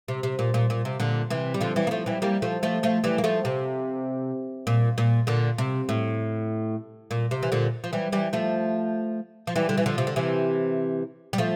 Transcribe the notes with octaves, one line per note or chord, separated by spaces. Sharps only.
C3
C3
A#2
A#2
A#2
C3
A#2 D3
C3 E3
G3
D3 F3
E3 G3
A#3
F3 A3
E3 G3
G3 A#3
F3 A3
F3 A3
F3 A3
E3 G3
A#3
F3 A3
C3
A#2
A#2
A#2 D3
C3
A2
A#2
C3
E3
A#2 D3
F3
E3 G3
E3 G3
F3 A3
F3
E3 G3
D3
E3
D3 F3
C3
D3
C3 E3
G3
F3 A3